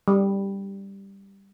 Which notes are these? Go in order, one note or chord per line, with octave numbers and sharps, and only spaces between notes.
G3